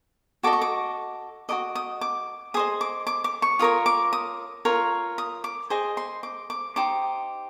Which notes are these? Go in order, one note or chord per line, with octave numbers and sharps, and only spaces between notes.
F#4 A4 D#5 D6
C#6
D6
F#4 A#4 D#5 D6
D#6
D6
G#4 C5 D#5 D#6
D6
D6
D6
C#6
F4 A#4 C#5 D#6
D6
D#6
F4 A#4 C#5
D#6
D6
G#4 C5 D#5
C6
D6
D6
D#4 G4 C5 D6